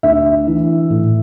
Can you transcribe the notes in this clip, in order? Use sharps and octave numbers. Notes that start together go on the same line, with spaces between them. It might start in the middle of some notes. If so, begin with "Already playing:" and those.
D2 E5
E3
A2